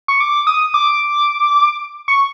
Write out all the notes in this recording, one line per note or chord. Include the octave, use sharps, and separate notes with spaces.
C#6
D6
D#6
D6
C#6